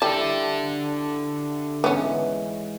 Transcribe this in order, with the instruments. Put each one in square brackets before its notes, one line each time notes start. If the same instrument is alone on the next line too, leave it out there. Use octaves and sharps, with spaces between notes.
[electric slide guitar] D3 A4 A5 [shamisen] G3 [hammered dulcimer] E4 G4
[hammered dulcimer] G#2 E3 G#3 [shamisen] B3 C#4